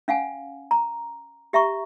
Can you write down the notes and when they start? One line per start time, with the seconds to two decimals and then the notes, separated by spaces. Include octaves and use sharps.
0.08 C#4 F5 F#5 G#5
0.71 A#5
1.53 G4 E5 A#5 C#6